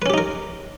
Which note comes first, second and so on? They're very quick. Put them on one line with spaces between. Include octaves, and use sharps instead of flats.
B4 C#4 G4 D#4 A#4